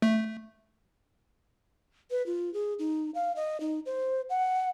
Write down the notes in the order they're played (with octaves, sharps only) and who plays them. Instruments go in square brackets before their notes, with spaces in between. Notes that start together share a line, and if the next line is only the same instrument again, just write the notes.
[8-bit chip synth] A3
[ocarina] B4
F4
G#4
D#4
F5
D#5
D#4
C5
F#5